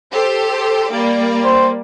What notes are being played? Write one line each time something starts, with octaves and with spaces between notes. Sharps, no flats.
G4 A4 C5
G3 A#3 D5
C5